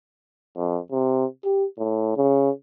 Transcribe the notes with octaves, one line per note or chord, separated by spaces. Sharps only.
F2
C3
G4
A2
C#3